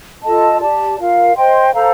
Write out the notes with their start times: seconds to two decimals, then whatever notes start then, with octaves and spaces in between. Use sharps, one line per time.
0.23 F4 A4 D#5 A5
0.61 G4 D5 A5
0.98 F4 A#4 F5
1.36 C5 D#5 G5 C6
1.74 A4 C5 F5 A#5